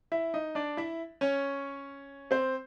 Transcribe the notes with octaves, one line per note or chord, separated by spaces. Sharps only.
E4 E5
D#4 D#5
D4 D5
E4 E5
C#4 C#5
C4 C5